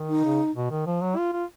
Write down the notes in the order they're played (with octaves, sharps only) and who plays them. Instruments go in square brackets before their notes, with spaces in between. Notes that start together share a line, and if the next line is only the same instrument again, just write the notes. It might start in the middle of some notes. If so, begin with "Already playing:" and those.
Already playing: [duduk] D#3
[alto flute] D#4
[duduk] C#3
B2
D#3
F3
F#3
F4
F4